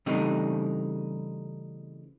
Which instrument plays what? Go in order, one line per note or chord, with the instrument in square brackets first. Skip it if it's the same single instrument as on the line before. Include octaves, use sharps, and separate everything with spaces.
[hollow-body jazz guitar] C#3 E3 G3 A3 C4 D#4